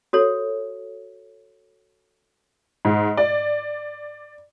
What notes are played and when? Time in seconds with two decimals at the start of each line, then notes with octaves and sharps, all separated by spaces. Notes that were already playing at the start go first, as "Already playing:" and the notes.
0.13 F#4 A4 C#5
2.85 G#2
3.17 D5